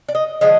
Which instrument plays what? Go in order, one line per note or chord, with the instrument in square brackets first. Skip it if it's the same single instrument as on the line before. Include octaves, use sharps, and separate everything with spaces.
[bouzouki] D5
D#5
D3 F3 G#3 D#5